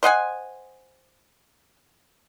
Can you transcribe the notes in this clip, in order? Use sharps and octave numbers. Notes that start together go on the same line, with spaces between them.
C5 D#5 F#5 G#5